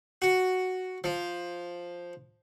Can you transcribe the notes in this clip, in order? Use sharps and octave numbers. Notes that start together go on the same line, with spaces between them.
F#4
F3